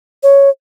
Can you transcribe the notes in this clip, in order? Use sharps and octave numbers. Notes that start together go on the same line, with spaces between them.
C#5